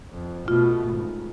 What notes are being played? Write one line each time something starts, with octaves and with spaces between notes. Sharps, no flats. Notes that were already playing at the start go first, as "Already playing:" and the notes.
F2
B2 A3 F4
G#1